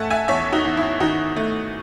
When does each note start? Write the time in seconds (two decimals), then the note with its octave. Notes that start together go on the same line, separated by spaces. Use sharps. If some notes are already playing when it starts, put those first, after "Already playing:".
Already playing: A3 E5 F#5 G#5 A5
0.10 E5 G#5
0.28 E2 C#5 E5
0.52 D#4 F#4
0.65 E2
0.77 E4
1.00 D#3 D#4 F#4
1.36 A3